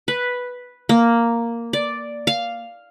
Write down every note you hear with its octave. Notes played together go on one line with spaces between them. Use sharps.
B4
A#3
D5
F5